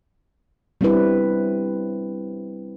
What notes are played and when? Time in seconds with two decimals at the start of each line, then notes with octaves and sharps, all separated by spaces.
0.81 G3 C4 D4 E4 B4